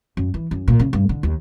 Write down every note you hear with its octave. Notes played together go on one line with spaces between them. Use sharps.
F#2
E3
F#2
A#2
C#3
G2
D3
D#2